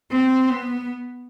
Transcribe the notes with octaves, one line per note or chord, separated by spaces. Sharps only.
C4
B3